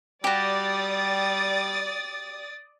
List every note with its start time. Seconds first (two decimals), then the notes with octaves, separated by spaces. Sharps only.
0.24 G3 F#4 G4 D5 D#6 A6